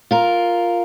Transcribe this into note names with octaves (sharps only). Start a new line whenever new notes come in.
F4 A#4